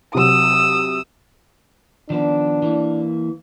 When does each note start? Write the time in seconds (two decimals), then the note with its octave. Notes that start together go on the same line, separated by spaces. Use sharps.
0.15 C3 F#3 D#6 E6
2.10 D#3 F3 B3 D4
2.62 E3 A#3